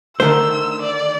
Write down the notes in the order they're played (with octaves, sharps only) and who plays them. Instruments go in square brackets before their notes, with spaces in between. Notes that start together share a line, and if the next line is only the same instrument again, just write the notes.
[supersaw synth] D3 D#3 A3 [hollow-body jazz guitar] A#4 C5 [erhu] E6
[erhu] D5